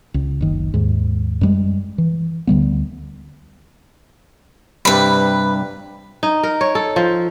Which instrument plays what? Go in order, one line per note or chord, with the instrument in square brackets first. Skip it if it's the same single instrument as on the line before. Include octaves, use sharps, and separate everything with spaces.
[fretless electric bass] C#2
F#1 D#3
D#2 G#2
F#2 G3 G#3
E3
D2 D3 G3 B3
[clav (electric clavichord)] G2 C3 G3 [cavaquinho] B4 B5
[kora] D#4
A#4
C#5
A4
F3